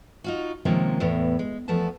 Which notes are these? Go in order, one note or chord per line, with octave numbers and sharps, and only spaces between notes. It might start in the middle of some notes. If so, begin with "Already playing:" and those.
D#4 F4 F#4
C3 D#3 F3 G#3 A#3 C#4
E2 A2 B3
G#3
E2 F3 A3 B3 A5